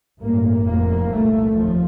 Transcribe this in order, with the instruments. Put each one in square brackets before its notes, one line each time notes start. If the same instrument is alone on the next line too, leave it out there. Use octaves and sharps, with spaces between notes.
[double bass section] A1 G2 A#3
F1 F2 C3 A#3
C2 A#2 A3
F1 D#2 F3